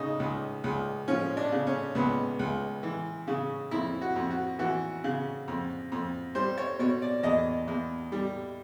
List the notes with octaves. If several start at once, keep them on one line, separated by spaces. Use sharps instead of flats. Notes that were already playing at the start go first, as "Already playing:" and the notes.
Already playing: C#3 D#4
C#2
C#2
F3 C#4
D4
C#3
C#4
C#2 B3
C#2
E3
C#3
F2 E4
F#4
F2
F#4
E3 F#4
C#3
F2
F2
G3 C5
C#5
B2 C#5
D5
E2 D#5
E2
G3